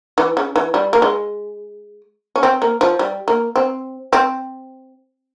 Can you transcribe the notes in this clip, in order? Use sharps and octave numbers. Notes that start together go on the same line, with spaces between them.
E3
C#3
E3
G3
A#3
G#3
C#4
C4
A#3
F3
G3
A#3
C4
C4